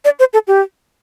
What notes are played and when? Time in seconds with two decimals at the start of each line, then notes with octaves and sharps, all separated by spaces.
0.05 D5
0.19 C5
0.33 A4
0.48 G4